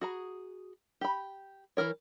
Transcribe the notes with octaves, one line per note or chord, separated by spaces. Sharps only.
F#4 G#4 A#5
G4 B5
E3 A#3 A#4 C#5